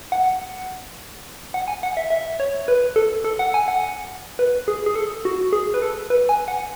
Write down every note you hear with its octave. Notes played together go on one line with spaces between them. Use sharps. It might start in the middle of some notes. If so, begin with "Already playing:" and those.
F#5
F#5
G#5
F#5
E5
E5
C#5
B4
A4
A4
F#5
G#5
F#5
B4
G#4
G#4
A4
F#4
G#4
B4
A4
B4
G#5
F#5